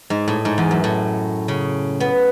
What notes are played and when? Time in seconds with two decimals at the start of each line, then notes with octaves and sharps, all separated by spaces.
0.10 G#2
0.28 A2
0.45 G#2
0.58 E2
0.71 F#2
0.84 A2
1.48 C#3
2.00 B3